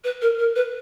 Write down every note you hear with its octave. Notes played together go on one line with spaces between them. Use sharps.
B4
A#4
A#4
B4